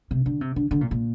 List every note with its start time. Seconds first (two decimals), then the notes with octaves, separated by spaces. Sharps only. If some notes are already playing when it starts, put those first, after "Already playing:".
0.11 C3
0.26 D3
0.41 C3
0.56 D3
0.71 D3
0.81 A#2
0.91 A#2